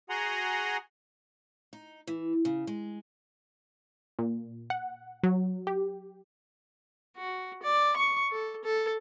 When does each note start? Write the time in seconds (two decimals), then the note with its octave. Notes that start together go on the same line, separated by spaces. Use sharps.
0.10 F#4 G#4 F#5 G#5 A#5 C6
1.73 D#4
2.07 E3
2.45 C#3
2.67 G#3
4.19 A#2
4.70 F#5
5.23 F#3
5.67 G4
7.17 F#4
7.63 D5
7.96 C#6
8.32 A4
8.64 A4